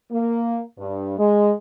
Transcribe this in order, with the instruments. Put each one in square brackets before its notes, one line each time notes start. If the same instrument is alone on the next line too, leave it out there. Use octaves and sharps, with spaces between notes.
[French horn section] A#3
G2
G#3